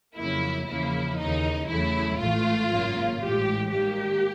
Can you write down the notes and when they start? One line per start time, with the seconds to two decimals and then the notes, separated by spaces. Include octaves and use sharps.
0.17 F2 C#3 F#3 A#3 E4
0.67 E2 C#3 F3 A#3 E4
1.17 D#2 C#3 E3 D#4
1.68 E2 C#3 F#3 A3 E4
2.19 A1 G#2 E3 A3 F4
2.69 G#1 F#2 C#3 F#3 A#3
3.20 A1 A2 E3 G#3 G4
3.71 G#2 D#3 G3 A#3 G4